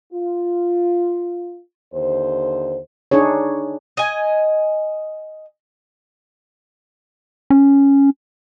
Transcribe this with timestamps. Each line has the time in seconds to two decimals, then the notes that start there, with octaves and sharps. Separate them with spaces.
0.13 F4
1.94 D#2 D3 C5
3.11 D4 D#4 G#4 C#5
3.97 D#5 G#5
7.50 C#4